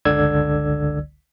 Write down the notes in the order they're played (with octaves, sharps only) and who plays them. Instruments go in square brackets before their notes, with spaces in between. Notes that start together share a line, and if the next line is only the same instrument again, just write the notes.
[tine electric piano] G1 C#2 D3 D5 E6 G#6